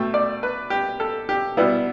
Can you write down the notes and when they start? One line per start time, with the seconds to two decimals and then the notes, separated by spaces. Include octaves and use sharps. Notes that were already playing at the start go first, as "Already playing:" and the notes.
Already playing: B2 A3 G5
0.14 D5
0.43 B4
0.70 G4
1.00 A4
1.29 G4
1.57 B2 G3 B3 E4